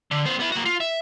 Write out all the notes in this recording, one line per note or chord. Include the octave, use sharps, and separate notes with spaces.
D3
B3 C5
B3 E4
A#3 F#4
F4
E5